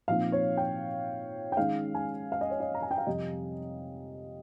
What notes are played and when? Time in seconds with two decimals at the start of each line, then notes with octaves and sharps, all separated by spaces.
0.08 A#2 F3 C4 D#4 F5
0.32 C#5
0.57 G5
1.52 G5
1.57 D#3 G#3 C#4 F5
1.94 G#5
2.32 F5
2.41 D#5
2.50 C#5
2.60 D#5
2.74 A#5
2.82 G#5
2.91 G5
2.98 F5
3.06 F2 C3 G3 D#5